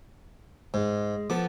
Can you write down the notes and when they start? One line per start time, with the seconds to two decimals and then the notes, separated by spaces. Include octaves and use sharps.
0.74 G#2 G#3
1.30 F3 B3 A4 D6